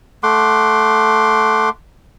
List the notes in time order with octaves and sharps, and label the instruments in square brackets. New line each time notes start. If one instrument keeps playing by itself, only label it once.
[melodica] A3 F#5 C6 D6